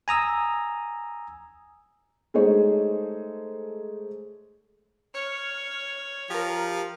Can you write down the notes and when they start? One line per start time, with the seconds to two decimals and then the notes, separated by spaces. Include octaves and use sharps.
0.08 G#5 A#5 D#6 E6
2.34 G#3 A3 D#4 G#4 C5 C#5
5.15 C#5 F6 C#7
6.30 F3 G4 A#4